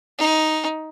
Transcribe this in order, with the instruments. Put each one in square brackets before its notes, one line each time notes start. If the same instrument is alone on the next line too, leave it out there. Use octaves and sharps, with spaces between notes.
[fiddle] D#4